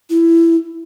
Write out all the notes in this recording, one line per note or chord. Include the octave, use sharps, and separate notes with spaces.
E4